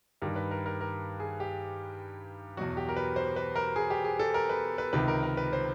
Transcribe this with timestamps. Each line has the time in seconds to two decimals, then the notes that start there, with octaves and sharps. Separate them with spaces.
0.22 G2 D#3 G3 A#4
0.36 B4
0.51 A#4
0.66 A#4
0.81 A#4
1.20 G#4
1.40 G4
2.57 E2 B2 F#3 F#4
2.77 G4
2.89 A#4
2.97 B4
3.16 C5
3.36 B4
3.56 A#4
3.76 G#4
3.90 G4
4.04 G#4
4.19 A4
4.34 A#4
4.49 B4
4.78 B4
4.93 C#2 C3 D#3 B4
5.08 A#4
5.23 A#4
5.37 B4
5.53 C5